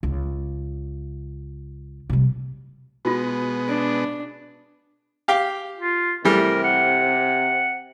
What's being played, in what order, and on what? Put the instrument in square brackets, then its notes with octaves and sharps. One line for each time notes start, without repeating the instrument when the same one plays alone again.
[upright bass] C#2
C3 G3
[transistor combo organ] B2 G#3 B3 [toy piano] F4 F#4
[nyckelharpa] D4
[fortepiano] G4 F5 G5
[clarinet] F4
[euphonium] C3 [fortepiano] E3 G3 A3 [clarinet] A#4
[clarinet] F#5